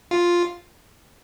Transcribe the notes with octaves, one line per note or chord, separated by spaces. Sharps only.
F4